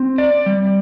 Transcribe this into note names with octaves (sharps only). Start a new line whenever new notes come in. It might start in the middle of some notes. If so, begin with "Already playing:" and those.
Already playing: C4
D5
G3